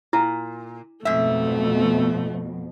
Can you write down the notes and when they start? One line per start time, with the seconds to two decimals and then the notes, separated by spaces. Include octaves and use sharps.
0.13 A#2 E4
1.05 F2 G#2 B2 A3 E5